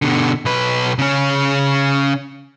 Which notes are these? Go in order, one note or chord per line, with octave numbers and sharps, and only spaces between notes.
B2 D3
B1 B4
C#3 C#4